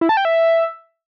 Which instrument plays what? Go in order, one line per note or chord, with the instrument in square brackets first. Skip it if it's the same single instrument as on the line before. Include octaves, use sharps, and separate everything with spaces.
[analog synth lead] E4
A5
G5
E5